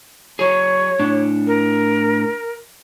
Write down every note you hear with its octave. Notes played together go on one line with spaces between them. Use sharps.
F#3 G#4 C#5
A2 D4
A#4